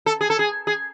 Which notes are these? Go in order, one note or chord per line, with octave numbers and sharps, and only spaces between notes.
A4
G#4
A4
G#4
G#4